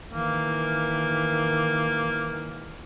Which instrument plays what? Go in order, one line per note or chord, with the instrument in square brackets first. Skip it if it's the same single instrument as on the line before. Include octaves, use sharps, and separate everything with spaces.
[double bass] D#3 E3 [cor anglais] A#3